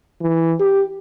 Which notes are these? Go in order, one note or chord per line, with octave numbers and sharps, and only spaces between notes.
E3
G4